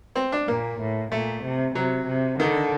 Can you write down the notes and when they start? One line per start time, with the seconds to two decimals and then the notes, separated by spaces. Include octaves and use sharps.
0.16 C4
0.32 D4
0.48 A#2 A#3
0.80 A2
1.12 A#2 A3
1.44 C3
1.75 C3 F#3
2.07 C3
2.39 D3 D#3